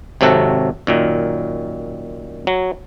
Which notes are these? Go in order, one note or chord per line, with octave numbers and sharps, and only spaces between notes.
G#1 C3 F#3 A4 F#5
F#2 A#2 D#3
F#3